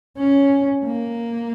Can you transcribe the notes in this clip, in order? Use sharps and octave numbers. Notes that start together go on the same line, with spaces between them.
C#4
A#3